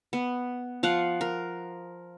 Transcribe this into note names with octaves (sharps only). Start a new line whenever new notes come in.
B3
F3 F5 F#5
A#4